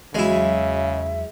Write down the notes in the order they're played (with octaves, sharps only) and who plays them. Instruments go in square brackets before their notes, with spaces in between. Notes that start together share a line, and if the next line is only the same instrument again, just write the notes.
[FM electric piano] E2 F#3 [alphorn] C#3 [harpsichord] G#3 E4 [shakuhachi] E5